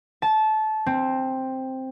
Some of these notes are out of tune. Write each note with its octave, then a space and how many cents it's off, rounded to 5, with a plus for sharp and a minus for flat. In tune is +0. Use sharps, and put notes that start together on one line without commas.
A5 -20
C4 +5